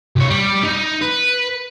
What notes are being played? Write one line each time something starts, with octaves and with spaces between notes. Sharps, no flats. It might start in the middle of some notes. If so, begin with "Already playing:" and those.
C2 C#5
G3
D#4
B4